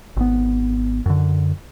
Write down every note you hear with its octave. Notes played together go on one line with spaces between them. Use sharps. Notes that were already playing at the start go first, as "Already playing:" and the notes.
G#1 B3
F#2 D3